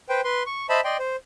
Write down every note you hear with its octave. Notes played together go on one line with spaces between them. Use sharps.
B4 C5 G5
B4 C6
C#6
C5 D#5 E5 A5 B5
D5 D#5 G5 C6
C5